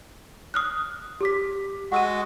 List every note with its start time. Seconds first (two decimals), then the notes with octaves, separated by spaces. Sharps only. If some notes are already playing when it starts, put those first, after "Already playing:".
0.54 D#6 F6 F#6
1.21 G4 D6 B6
1.92 G#3 F#4 F#5 E6 D#7